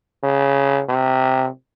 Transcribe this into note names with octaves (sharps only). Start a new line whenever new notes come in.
C#3
C3